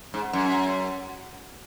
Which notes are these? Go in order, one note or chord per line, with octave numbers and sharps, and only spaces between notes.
G#2
F#2